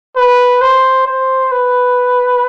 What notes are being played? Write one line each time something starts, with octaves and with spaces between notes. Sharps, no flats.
B4
C5
C5
B4